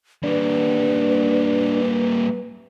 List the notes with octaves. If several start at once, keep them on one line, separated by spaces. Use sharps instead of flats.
G3 A#3 D4 B4